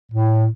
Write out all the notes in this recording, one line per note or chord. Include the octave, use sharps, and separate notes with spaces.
A2